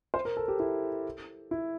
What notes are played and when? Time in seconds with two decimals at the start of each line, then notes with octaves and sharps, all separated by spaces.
0.14 C5
0.25 A#4
0.37 A4
0.48 G4
0.60 E4
1.51 E4